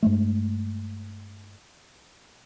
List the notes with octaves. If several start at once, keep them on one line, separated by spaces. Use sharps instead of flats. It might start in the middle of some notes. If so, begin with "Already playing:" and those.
G2 G#3 A3